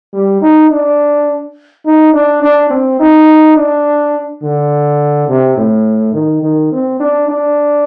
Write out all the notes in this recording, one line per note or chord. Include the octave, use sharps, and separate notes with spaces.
G3
D#4
D4
D#4
D4
D4
C4
D#4
D4
D3
C3
A2
D#3
D#3
C4
D4
D4